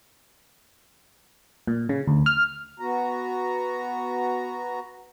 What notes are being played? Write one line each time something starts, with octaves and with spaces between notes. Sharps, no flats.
A#2
C#3
D2
F6
B3 F#4 A#5